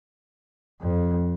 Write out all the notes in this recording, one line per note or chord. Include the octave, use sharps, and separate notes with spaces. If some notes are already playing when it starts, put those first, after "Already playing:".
F2